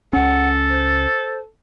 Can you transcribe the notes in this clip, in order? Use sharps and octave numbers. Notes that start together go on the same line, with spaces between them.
C#2 C#4 A4 F#5
C5